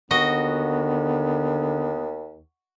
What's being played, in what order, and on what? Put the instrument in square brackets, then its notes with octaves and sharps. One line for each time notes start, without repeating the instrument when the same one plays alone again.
[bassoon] D#2 [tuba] D3 [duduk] B3 [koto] F#4 D#5